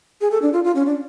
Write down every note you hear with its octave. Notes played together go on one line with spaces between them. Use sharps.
G#4
A4
D4
F4
F4
C#4
D4